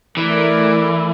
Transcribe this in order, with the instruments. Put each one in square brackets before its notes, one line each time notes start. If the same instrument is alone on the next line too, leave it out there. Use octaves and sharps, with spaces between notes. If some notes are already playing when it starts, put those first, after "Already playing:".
[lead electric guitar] E3 [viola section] A3 E4 A#4 D5